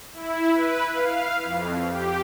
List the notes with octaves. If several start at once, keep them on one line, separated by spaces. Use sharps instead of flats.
E4
B4
F5
F2
G4